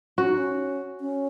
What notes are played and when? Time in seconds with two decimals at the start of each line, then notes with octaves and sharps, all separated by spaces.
0.18 C#4 F#4
0.27 D#4
0.37 C#4
1.00 C#4